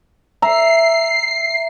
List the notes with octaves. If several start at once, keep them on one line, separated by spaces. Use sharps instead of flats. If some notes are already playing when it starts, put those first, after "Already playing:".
E5 A#5 C7